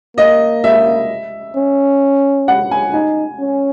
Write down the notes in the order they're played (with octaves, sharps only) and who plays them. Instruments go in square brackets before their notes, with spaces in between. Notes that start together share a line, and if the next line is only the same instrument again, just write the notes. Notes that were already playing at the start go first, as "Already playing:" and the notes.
[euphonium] A#3 [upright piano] D#5
[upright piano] E5
[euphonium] C#4
[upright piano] F#5
G#5
[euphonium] D#4 [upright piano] G#5
[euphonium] C#4